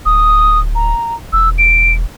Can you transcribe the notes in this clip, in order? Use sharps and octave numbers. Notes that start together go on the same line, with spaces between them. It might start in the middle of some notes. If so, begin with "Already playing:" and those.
D1 D#6
A#5
E1 E6
D7